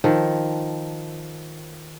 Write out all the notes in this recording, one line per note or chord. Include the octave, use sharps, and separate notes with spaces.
D#3 F3 A4